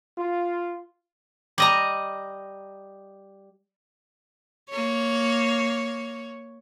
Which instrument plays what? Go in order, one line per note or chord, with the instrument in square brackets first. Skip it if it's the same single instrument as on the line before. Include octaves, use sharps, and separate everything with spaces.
[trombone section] F4
[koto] G3 D#5 A#5
[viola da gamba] A#3 C#5